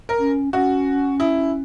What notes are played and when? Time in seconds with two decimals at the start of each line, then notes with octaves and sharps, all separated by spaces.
0.09 A#4
0.19 C#4
0.53 C#4 F#4
1.20 E4